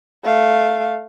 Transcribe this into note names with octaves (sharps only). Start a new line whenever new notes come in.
A3 F5